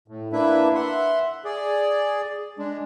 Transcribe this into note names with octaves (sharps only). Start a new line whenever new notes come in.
A2
A#3 D4 E4 B4 E5
E5 F#5 C6
G#4 D5
G#3 D4